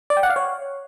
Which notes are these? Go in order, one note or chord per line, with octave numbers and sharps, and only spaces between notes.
D5
G5
F#5
F5
C#5